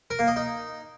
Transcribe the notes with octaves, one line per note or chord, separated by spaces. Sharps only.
A#4
A#3
D#5
D#4